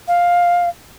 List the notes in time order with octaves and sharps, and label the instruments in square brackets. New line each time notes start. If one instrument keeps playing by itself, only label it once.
[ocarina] F5